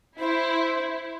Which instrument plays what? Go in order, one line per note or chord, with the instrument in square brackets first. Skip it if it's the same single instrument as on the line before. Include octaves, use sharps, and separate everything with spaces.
[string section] E4 [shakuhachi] C5